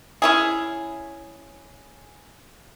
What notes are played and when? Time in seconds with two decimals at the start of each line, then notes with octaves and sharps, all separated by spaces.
0.22 C#4 E4 G#4